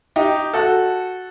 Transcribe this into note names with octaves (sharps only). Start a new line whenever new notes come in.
D#4 G4
F#4 A4